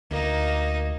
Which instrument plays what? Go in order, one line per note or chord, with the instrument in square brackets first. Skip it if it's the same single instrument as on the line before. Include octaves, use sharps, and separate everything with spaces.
[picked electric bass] D2 [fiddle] A#3 D#4